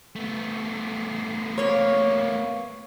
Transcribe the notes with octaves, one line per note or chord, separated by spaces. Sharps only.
A3 B3
A#3 C#5